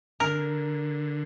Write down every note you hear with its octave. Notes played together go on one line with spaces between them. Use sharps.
D3 A#4